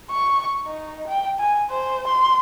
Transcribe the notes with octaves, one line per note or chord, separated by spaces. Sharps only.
C#6
D#4
G5
G#5
C5
C6